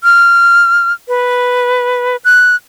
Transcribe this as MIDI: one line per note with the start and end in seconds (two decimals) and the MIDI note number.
0.04 0.93 89
1.08 2.17 71
2.25 2.56 90